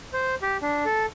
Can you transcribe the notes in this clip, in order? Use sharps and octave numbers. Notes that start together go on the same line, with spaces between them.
C5
G4
D4
A4